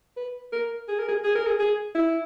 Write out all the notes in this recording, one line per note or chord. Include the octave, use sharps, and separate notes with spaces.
B4
A#4
G#4
A#4
G#4
G#4
A#4
G#4
G#4
E4